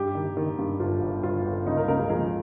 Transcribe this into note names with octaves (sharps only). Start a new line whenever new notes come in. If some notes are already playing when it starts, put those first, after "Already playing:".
Already playing: G2 G4
D#3
D#3
G2
G1 F4
G1
G1 F4
G1
C#2 D#4
A#4
C#2 A#4
G#4
F3 G#4